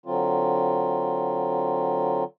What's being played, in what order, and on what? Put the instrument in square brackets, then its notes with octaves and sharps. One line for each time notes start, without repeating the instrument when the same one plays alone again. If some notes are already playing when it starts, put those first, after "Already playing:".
[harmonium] D3 F#3 C4 F4